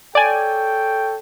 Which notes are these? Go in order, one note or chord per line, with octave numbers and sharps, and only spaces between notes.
A4 C#5 D5 G5 G#5